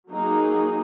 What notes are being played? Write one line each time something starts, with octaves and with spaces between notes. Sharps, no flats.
F#3 A#3 D#4 G#4